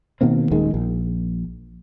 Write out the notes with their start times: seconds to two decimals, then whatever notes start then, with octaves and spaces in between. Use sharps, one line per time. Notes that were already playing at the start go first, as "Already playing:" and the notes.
0.21 B2 D#3 A#3 C4
0.51 D#1 D#3 G#3
0.74 A#1